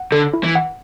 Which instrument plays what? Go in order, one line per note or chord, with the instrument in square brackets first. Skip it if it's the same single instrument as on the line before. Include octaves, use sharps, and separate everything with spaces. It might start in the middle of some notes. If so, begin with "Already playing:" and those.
Already playing: [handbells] F#5
[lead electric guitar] D3 [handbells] A4
[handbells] E4
[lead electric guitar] E3
[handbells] F#5